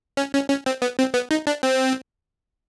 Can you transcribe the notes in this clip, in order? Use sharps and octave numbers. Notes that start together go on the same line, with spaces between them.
C#4
C#4
C#4
C4
B3
C4
B3
D#4
D4
C4